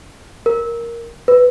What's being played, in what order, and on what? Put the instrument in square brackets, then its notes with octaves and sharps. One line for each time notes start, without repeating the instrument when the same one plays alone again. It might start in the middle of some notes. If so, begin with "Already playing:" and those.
[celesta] A#4
B4